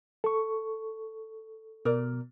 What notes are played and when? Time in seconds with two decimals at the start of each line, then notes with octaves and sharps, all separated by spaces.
0.24 A4 C#6
1.85 B2 A#4 D5